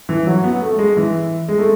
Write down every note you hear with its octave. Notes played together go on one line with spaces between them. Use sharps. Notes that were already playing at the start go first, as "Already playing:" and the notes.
E3
F#3
B3
A3
G#3
E3
G#3
A3